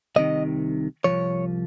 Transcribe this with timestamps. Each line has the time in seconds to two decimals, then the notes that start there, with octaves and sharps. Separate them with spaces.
0.16 C2 C3 D#3 D#5
1.04 C2 C3 F3 C#5